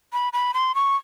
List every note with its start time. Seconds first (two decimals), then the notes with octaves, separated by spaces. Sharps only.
0.13 B5
0.33 B5
0.54 C6
0.75 C#6